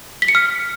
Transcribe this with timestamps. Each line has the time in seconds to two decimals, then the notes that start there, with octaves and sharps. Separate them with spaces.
0.22 B6
0.28 C#7
0.35 F6